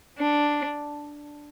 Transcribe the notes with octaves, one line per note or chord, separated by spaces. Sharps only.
D4